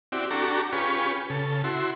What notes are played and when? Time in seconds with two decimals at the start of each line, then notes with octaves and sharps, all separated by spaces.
0.12 C4 E4 F#4 G4 D5
0.31 D4 F#4 G4 A4 A#5 C#6
0.73 C#4 F4 G4 G#4 B4 C#6
1.30 C#3 A4
1.64 E4 F#4 C6